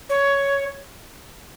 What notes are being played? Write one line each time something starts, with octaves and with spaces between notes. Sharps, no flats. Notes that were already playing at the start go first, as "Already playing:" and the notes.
C#5